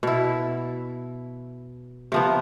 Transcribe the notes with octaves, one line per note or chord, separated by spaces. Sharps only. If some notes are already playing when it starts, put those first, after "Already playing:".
B2 E4
C3 F3 B3